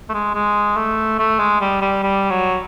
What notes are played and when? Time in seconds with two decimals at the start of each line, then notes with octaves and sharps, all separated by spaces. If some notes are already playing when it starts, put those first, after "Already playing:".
0.09 A3
0.14 G#3
0.34 G#3
0.76 A3
1.19 A3
1.39 G#3
1.61 G3
1.81 G3
2.03 G3
2.30 F#3